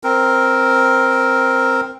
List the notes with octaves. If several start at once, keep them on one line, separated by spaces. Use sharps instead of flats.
C4 A#4